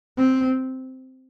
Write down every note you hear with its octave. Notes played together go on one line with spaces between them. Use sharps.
C4